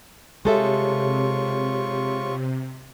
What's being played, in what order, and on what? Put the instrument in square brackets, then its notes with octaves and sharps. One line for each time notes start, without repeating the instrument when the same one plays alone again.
[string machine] C3 [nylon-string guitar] G#3 A4 E5 [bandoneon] F4 C#6 [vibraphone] G4 C#5